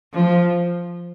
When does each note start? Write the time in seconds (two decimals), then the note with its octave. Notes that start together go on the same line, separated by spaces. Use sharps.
0.13 F3